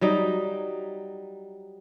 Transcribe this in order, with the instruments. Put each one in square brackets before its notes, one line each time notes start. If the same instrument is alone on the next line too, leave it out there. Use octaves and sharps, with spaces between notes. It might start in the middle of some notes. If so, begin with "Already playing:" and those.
[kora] F#3 G3 D#4